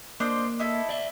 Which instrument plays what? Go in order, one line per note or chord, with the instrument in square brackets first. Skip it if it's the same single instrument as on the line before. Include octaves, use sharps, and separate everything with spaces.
[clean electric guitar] A#3 [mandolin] D4 C5 D#5
[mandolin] D#4 E4 A4
[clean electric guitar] D5 E5